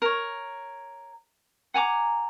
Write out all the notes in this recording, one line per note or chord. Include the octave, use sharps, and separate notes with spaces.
A#4 C#5
F#5 G#5 A#5 D6